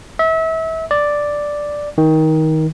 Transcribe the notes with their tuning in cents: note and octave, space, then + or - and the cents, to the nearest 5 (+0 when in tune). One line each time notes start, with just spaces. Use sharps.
E5 -30
D5 +0
D#3 +20